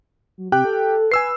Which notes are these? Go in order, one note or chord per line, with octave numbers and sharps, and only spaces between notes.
F#3
C3 G4 G5 F#6
A4
B4 G#5 E6 C7